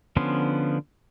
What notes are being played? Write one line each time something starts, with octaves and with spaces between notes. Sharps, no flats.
D3 F3 B3 C#4 C6